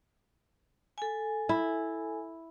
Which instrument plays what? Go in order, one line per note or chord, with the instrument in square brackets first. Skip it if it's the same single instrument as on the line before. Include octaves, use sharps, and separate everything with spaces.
[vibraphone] A4 G#5
[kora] E4